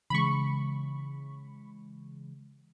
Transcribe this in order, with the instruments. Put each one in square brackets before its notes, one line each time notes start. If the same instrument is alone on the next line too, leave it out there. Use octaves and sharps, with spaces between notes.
[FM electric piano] C#3 E3 G#3 [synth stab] B5 C#6